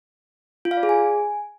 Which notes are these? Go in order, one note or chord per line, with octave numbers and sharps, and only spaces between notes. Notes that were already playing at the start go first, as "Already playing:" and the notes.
F4
F5
D5
G#4
G#5